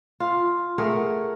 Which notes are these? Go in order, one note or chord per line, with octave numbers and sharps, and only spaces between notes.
F4
A3 G#4 A#4 F#5